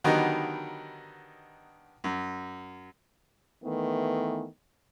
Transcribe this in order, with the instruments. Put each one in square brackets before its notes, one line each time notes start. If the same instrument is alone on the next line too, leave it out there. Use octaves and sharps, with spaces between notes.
[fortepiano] D3 D#3 F#3 G3 B3 D#4
F#2
[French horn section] D#3 E3 A3 B3